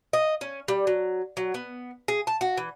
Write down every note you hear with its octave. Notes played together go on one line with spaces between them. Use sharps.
D#5
C#4
G3
F#3
F#3
B3
G#4
A5
F#4
E3